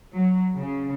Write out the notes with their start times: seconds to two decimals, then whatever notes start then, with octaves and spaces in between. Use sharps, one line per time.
0.16 F#3
0.58 C#3